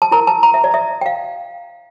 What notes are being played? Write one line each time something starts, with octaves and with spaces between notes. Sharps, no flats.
A5
E4 A#4 A#5
A5
A#5
E5
D5
E5
G5
F5